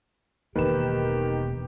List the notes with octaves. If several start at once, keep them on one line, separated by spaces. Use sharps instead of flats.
E1 D#3 A#3 G4 B4 E7